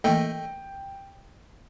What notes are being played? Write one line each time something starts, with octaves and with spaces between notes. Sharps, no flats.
E3 A3 A#3 A4 D#5 G5 D#7